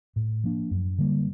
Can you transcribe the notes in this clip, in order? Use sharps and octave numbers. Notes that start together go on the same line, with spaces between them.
A2
F3 A#3 D4
F#2
D3 G3 A#3